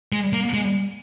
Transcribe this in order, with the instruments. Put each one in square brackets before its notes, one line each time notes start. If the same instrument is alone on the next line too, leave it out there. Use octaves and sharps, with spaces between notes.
[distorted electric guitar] G#3
A#3
G#3